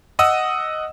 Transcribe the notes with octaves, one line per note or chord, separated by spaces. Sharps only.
D#5 F#5 D#6 E6